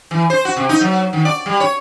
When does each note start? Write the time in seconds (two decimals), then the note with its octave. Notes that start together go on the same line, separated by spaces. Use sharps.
0.11 E3
0.30 C5
0.45 F#4
0.56 C3
0.69 D#4
0.81 F#3
1.13 D#3
1.25 D5
1.46 G3
1.60 C#5